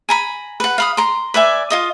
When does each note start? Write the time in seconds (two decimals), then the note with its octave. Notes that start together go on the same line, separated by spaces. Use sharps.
0.09 G#5 A#5 B5
0.60 B4 F#5
0.78 F5 B5 D#6
0.97 A#5 C6
1.34 B4 D5 E5 G#5
1.70 F4 D#5 D#6